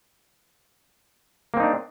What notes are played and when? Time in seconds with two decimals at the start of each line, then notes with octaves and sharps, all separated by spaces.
1.54 A#3
1.57 C4
1.60 D#4
1.63 D4